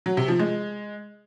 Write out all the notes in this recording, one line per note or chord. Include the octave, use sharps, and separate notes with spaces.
F#3
C3
F3
G#3